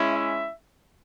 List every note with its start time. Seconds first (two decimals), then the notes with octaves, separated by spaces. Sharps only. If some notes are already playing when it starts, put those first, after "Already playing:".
Already playing: G#3 C#4 E4
0.12 E5